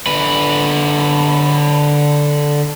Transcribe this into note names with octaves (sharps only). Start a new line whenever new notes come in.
D3 B4